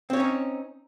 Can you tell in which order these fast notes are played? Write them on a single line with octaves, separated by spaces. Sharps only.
C4 C#5 C#4 D#4